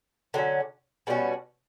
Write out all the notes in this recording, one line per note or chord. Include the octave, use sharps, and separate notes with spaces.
D3 F#3 C#4
B2 G3 C#4 F#4